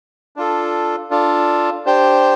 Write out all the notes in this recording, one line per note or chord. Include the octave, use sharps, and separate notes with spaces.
D4 F4 A4
D4 F4 A4
D4 G4 C5 G5